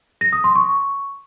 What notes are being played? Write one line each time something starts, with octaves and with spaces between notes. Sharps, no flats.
A#6
D#6
C6
C#6